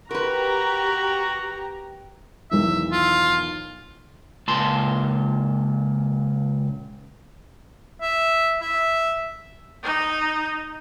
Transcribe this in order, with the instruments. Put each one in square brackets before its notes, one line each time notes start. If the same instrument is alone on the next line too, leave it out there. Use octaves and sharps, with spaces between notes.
[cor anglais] F#4 [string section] G4 A#5 [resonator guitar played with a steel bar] A#4 B4
[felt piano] B1 E2 D#3 [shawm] E5
[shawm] F4
[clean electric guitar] C#2 A#2 A5 C6
[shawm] E5
E5
[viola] D#4